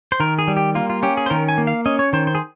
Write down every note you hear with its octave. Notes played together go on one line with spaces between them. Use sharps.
C5
D#3 A#4
G#4
G3
G4
A#3 F4
F4
C#4 G4
G#4
C5
D#3 A#4
G#5
A#3
F5
C#4 D#5
C#5
D#3 C5
C5
G#4